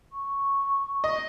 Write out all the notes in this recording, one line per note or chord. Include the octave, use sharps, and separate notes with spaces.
C#6
D#5